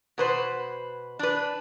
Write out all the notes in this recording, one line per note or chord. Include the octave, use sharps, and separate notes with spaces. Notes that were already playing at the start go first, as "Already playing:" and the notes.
B2 B4 C5
D4 B4